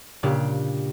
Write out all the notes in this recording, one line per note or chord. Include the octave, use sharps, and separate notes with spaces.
A#2 C#3 D4 G4